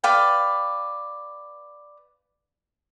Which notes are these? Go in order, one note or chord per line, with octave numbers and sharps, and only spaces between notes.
B4 D5 F5 G5